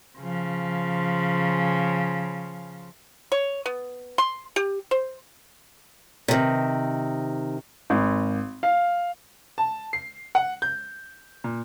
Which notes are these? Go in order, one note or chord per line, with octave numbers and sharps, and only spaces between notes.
C#3 F3
C#5
B3
C6
G4
C5
C3 D#3
G#1
F5
A5
C7
F#5
G6
A#2